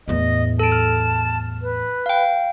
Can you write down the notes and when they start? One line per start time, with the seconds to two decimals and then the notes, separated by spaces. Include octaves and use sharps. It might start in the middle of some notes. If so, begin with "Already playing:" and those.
0.08 E2 A2 D#5
0.59 A4 A5 D7
0.72 F6
1.62 B4
2.06 F5 G5